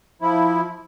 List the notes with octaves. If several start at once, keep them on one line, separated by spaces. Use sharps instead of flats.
F3 E4